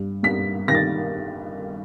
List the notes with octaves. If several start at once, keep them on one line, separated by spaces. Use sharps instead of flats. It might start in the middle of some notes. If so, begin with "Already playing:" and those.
Already playing: G2
G2 B6
D#3 A#6
A6